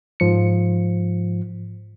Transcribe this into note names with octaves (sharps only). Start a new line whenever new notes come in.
G#2 F3 C#7